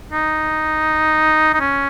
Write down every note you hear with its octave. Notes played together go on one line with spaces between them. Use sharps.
D#4
D#4
C#4